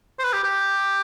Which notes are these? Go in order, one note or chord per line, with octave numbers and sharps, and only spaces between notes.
C5
B4
G4
G4